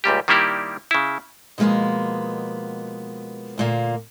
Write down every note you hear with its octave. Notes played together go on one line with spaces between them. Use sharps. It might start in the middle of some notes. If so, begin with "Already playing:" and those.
C#2 A#2 G3 G4
D#3 G3 A#3 E4 G4 D5
C#3 E4
B2 F3 G#3 A#3 B3
D2 A#2 A#3